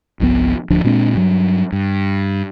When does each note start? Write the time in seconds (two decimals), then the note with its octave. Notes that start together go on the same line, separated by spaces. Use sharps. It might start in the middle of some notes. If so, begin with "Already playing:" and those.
0.20 G1 C2 F3 B3
0.70 D1 D2 F3 D4
0.84 A#2 G#3 C4 D4
1.15 G2 F#3
1.72 G2